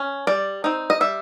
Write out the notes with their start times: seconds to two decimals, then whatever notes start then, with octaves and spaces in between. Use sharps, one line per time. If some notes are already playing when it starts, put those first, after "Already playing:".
Already playing: C#4
0.27 G3 D5
0.64 C4 D#4
0.90 D#5
1.00 G3 E5